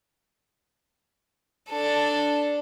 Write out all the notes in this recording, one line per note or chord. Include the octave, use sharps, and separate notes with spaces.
D4 A4